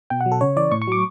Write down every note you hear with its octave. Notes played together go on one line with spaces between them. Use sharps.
B2 G5
F#5
F#3
A4
C#3 C#5
E3 D5
A2 C#6
C#6
F#3 D6